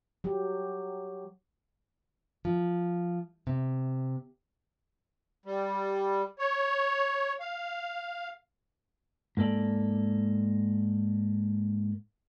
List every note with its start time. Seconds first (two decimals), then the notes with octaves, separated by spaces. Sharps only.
0.24 F#3 G4
2.45 F3
3.47 C3
5.45 G3
6.39 C#5
7.40 F5
9.37 G#2 A#3 A4 D5